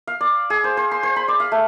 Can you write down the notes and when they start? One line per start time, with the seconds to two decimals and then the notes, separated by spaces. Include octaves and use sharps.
0.07 F5
0.21 D5
0.50 G#4
0.64 C5
0.77 C5
0.91 C6
1.03 C5
1.16 B5
1.28 D5
1.40 F5
1.52 A3